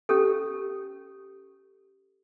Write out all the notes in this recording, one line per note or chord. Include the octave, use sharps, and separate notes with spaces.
C#4 G4 A4